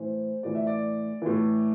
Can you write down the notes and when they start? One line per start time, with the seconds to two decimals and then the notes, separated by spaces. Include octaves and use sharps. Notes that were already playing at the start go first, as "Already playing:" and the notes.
Already playing: A2 E3 C5
0.43 A2 E3 D5
0.55 E5
0.67 D5
1.22 A2 E3